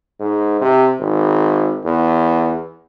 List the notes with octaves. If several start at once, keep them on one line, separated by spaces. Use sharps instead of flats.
G#2
C3
G#1
E2